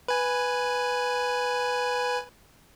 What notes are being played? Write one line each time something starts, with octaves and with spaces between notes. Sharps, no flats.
B4 G#5